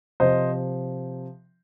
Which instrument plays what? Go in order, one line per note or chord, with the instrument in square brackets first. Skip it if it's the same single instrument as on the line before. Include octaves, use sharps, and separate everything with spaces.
[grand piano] C3 F3 C5 D#5